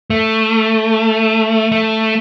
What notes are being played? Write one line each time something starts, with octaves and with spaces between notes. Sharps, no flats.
A3
A3